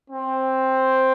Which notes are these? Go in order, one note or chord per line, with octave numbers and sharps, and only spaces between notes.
C4